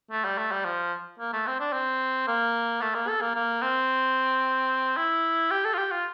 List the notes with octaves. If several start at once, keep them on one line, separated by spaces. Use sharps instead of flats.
A3
G3
A3
G3
F3
A#3
A3
C4
D4
C4
A#3
A3
A#3
A4
A#3
A#3
C4
E4
G4
A4
F4
G4
F4